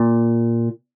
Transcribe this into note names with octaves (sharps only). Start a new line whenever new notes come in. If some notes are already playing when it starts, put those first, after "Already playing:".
Already playing: A#2